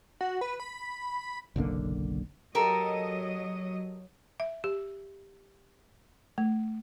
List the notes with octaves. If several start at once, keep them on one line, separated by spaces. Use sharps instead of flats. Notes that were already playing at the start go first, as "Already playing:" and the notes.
F#4
B4
B5
F#1 B1 D3 A#3
F#3 G4 A4 A#4 D#5
E5
G4
A3